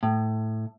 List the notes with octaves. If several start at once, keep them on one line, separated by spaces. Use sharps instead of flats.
A2